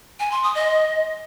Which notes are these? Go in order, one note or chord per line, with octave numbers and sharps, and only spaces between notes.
G#5
C6
D#6
D#5